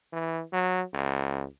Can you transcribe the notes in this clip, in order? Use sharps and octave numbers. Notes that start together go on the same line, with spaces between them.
E3
F#3
C#2